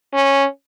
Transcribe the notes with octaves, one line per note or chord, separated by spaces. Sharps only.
C#4